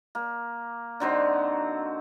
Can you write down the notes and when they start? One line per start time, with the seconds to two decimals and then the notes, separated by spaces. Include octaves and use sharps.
0.15 A#3
1.00 D3 F#3 C4 D#4